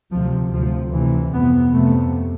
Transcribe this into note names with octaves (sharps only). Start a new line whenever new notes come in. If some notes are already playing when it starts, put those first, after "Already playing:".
D2 C3 F3
D2 C3 F3
D2 C3 E3
F2 C3 B3
F2 C3 A3